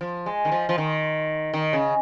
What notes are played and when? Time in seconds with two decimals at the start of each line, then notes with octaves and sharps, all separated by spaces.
0.01 F3
0.26 G#3
0.45 D#3
0.52 F3
0.69 F3
0.78 D#3
1.54 D#3
1.73 C#3